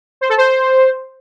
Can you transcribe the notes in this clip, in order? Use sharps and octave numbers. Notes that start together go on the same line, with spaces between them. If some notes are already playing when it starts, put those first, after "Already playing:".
C5
A4
C5